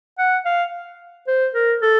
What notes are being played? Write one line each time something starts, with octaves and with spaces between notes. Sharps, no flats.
F#5
F5
C5
A#4
A4